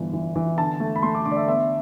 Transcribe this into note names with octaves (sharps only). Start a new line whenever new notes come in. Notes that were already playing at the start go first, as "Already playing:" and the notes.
Already playing: G1 E3 F3
E3
E3
D3 A5
A3
B5
A3 C6
D6
D3 D6
D5
E5
B3 E5